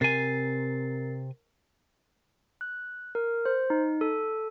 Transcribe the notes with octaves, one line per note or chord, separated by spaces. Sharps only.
C3 A#4 G#5 A6 C7
F#6
A#4
C5
D#4
A4